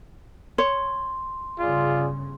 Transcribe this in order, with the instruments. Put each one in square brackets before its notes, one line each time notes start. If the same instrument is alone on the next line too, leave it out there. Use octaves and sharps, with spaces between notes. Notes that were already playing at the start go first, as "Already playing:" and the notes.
[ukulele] C#5 [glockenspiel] C6
[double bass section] G1 C#3 [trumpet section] F4 G#4 D5